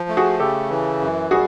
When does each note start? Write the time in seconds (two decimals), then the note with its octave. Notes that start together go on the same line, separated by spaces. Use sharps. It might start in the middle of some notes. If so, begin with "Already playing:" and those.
Already playing: F3
0.09 A3
0.17 F#4 G#4
0.39 C#3 G4 A4
0.70 E3
1.01 F#2
1.31 G3 F#4 G#4